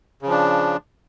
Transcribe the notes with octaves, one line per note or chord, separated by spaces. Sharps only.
C#3 F3 D4